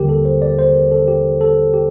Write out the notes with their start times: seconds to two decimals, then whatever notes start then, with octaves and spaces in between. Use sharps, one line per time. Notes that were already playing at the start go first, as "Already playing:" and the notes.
Already playing: D#2 D3 G3 A#3 G4 A#4
0.09 A4
0.25 C5
0.42 D5
0.59 C5
0.75 A#4
0.92 A4
1.08 G4
1.41 A4
1.74 G4